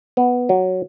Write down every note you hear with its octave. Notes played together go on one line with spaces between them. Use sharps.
B3
F#3